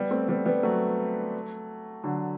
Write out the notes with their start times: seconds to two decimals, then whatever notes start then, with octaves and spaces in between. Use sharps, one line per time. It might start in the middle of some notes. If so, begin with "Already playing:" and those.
Already playing: G3 B3
0.11 A3 C4
0.29 G3 B3
0.45 G3 B3
0.63 F#3 A3
2.03 D3 F#3